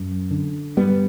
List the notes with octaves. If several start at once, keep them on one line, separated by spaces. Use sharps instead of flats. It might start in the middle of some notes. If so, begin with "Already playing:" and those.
Already playing: F#2
D3
G2 G3 B3